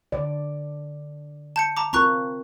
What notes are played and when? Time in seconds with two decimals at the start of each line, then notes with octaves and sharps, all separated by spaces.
0.12 D3 D5
1.56 A5 G6 C#7
1.77 A5 A#5 D6
1.93 C4 F4 A#4 A#5 C#6 F#6